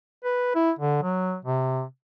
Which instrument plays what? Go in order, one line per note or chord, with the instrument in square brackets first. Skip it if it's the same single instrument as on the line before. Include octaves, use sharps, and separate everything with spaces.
[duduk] B4
E4
D3
F#3
C3